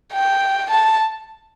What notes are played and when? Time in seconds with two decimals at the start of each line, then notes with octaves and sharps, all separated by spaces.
0.13 G5
0.71 A5